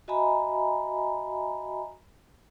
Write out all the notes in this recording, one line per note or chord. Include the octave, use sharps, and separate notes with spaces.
F#4 D#5 E5 G#5 A#5 B5